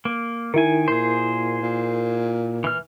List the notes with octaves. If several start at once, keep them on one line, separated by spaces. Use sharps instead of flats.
A#3
D#3 E4 A#4 G#5
A#2 G#4 C5
A#2
E3 F6